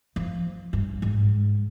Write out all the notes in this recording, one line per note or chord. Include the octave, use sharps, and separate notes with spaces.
F3
G2
G#2